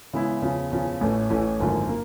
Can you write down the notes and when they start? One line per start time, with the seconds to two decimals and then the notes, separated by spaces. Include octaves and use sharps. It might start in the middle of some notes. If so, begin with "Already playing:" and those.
0.13 C#3 E3 G#3 B3 E4
0.42 E2 C#3 F3
0.71 E2 C#3 F3
1.01 A1 A2 E3 A3 C#4
1.30 A1 A2 E3 A3 C#4
1.60 G#1 F#2 D3 F3 A#3
1.89 A#3